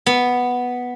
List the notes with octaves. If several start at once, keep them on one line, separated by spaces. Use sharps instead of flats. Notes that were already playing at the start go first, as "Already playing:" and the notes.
B3